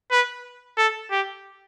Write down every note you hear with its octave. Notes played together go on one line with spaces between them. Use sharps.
B4
A4
G4